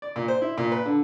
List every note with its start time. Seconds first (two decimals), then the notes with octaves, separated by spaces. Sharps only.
0.02 D5
0.16 A#2
0.28 C5
0.42 E4
0.58 A#2
0.72 B4
0.85 D3